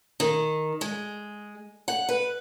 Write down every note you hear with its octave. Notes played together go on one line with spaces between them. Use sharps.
D#3
G#3
F#5
B4